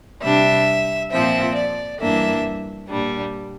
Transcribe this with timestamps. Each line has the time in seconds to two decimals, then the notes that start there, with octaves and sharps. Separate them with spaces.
0.23 C3 G3 D4 E5
1.11 A#2 F3 C4 E5
1.55 D5
2.00 G2 E3 A#3 D4 E5
2.88 A#2 G3 D4